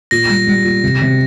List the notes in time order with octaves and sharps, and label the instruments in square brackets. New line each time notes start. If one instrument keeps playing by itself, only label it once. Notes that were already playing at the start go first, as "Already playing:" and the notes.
[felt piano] A#2 [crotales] A#6
[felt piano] G3
G3
A#2
C3
C3